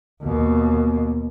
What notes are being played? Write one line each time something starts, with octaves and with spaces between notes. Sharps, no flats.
D#2 B2